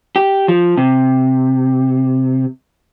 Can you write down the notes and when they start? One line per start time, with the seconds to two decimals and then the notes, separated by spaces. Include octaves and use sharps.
0.16 G4
0.48 F3
0.77 C3